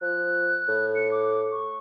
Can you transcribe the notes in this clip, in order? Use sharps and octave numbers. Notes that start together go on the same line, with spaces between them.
F3 F#6
A2
C#7
D6
C#6